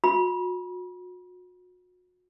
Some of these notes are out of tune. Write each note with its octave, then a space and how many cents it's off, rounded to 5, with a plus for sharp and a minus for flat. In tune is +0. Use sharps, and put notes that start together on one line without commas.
F#4 -40 B5 -40